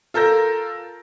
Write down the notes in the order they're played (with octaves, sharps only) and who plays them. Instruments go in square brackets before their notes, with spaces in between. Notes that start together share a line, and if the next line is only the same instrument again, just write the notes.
[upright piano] F4 A4 A#4 G6 A#6